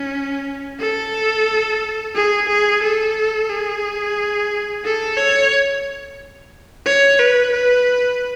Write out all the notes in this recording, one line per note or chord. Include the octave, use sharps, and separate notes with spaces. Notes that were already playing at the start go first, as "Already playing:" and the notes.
Already playing: C#4
A4
G#4
G#4
A4
G#4
A4
C#5
C#5
B4
B4